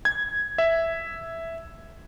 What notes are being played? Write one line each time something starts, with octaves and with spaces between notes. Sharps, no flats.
G#6
E5